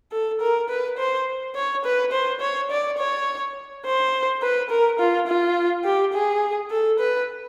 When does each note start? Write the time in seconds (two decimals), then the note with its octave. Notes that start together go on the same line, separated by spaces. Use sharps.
0.12 A4
0.41 A#4
0.69 B4
0.98 C5
1.55 C#5
1.85 B4
2.12 C5
2.41 C#5
2.71 D5
2.98 C#5
3.85 C5
4.42 B4
4.70 A#4
4.99 F4
5.27 F4
5.84 G4
6.13 G#4
6.71 A4
6.99 B4